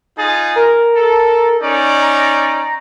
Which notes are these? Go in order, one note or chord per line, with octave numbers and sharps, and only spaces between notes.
D#4 F4 G#4 A6
A#4
A4
C#4 D#4 D5
A#5